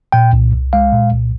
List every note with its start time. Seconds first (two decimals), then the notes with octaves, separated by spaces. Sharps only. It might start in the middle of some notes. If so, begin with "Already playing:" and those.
0.12 A#2 G5
0.33 C2
0.54 C2
0.73 G#3 F5
0.93 A#2
1.13 C2